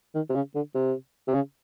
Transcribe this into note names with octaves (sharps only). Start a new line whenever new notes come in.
D#3
C3
C#3
D3
C3
C3
C#3